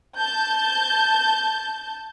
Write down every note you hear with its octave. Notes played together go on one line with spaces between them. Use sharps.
A5 G6